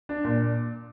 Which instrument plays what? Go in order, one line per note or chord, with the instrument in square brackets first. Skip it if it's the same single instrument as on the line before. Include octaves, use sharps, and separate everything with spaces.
[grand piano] D4
A#2